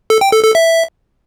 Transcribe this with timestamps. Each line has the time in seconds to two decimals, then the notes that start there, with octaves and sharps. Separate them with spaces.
0.10 A4
0.21 G5
0.33 A4
0.44 A4
0.55 E5